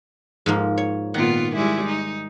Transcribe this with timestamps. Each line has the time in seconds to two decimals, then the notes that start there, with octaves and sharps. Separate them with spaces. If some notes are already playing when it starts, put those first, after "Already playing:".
0.46 G#2 F3 A#3
0.77 C#5
1.14 A#2 D#3 B3 F4 F#5
1.55 G3 G#3 E4
1.87 D#4